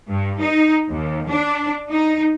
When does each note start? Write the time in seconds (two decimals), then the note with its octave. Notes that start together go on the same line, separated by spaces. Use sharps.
0.10 G2
0.40 D#4
0.90 D#2
1.29 D4
1.91 D#4